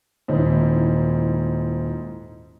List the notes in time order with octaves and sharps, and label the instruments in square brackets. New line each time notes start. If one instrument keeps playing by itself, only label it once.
[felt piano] D#1 [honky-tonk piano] G#2 E4